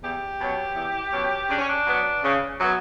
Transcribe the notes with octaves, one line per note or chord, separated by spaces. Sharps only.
E2 G4
B2 F#3 C#4
E2
B2 F#3 C#4
C#3 D4
C#4
D4
F#3 B3
C#3
F#3 B3